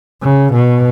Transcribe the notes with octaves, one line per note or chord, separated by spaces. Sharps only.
C#3
B2